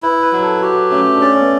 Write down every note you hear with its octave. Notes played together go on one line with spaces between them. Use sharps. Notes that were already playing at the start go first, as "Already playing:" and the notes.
E4 B4
B4
F#3
A4
F#4 G4
A3 C#4
D4
C#4 D5
C#4
B3